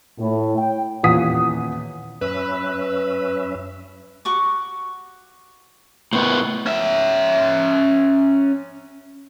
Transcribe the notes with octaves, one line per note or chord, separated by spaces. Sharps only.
A2
G5
D#1 E2 F4 F#5 D#6 B6
F#2 C#4 B4 E5
F#4 C#6 D6
A2 B3 C5 F#5 C#6
C#4 E5